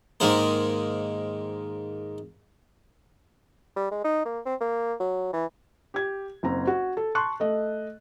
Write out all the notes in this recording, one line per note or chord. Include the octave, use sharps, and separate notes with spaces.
G#2 D#3 G#3 A#3 C5
G3
G#3
D#4
A#3
C4
A#3
F#3
E3
G4 G#6
F#1 C4 A#5
F#4
A4
A5 C6 C#6 F#6
A3 D#5